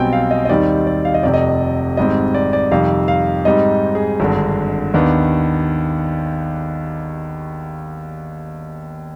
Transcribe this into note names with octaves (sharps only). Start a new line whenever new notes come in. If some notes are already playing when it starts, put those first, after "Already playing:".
Already playing: B1 B2 G3 C4 G5 G#5
F5
D#5
D#5
D#2 D#3 G3 C4 D#4 D5
D5
F5
D#5
F1 F2 C3 D5
D#5
G#1 G#2 G3 C4 D#5
D5
D5
F2 C3 D#3 G3 F5
F5
G#2 G3 C4 D#4 D#5
G#4
G#1 G2 D3
D#2 D#3 B3 D4